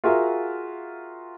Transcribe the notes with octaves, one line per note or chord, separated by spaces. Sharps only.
F4 F#4 G#4 A#4 E5 F5